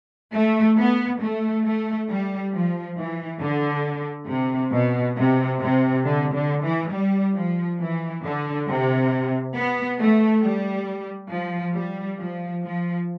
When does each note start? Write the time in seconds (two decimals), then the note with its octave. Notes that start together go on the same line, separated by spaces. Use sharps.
0.34 A3
0.78 B3
1.21 A3
1.65 A3
2.09 G3
2.53 F3
2.97 E3
3.40 D3
4.28 C3
4.72 B2
5.17 C3
5.60 C3
6.04 D3
6.34 D3
6.63 E3
6.92 G3
7.36 F3
7.80 E3
8.23 D3
8.67 C3
9.55 B3
9.99 A3
10.43 G3
11.31 F3
11.75 G3
12.19 F3
12.63 F3